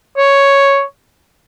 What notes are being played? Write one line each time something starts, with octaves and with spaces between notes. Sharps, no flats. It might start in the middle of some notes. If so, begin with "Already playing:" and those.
C#5